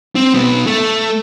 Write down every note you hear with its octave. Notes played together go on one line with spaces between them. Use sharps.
C4
B1 B3
A3